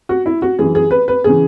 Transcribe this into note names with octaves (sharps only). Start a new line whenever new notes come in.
F#4
E4
F#4
F#2 E3 G#4
G#4
B4
B4
C#3 E3 G#4